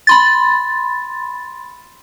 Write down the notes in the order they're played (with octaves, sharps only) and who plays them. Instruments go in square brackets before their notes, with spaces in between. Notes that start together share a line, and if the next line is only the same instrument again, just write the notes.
[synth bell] B5 C6 A6